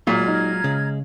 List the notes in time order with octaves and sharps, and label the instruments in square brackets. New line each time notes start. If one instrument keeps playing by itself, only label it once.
[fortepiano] A#2 [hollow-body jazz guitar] F#3 G#3 F#4 [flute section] A#5 F6 G#6
[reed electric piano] D#4
[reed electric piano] C#3 [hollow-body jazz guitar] G#3